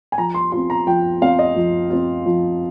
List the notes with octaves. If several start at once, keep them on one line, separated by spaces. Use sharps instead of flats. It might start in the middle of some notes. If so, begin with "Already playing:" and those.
G#5
F3 A#5
C6
C4 F4 C6
A#5
F3 G5
C4 F4 F5
D#5
F3
C4 F4
F3